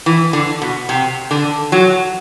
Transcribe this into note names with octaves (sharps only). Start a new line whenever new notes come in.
E3
D3
B2
C3
D3
F#3